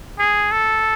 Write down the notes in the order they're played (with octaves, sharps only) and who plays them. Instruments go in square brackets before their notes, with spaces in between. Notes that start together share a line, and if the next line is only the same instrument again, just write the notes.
[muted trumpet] G#4
A4